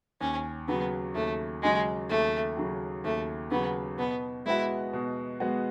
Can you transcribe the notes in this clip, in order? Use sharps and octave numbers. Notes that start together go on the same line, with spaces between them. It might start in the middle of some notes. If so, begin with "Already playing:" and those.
D#2 C#4
C#3 F#3 B3
D#2 A3
C#3 F#3 G#3
D#2 A3
C#3 F#3
D#2 A3
C#3 F#3 B3
B2 B3
G#3 B3 E4 F#4
B2
G#3 B3 F#4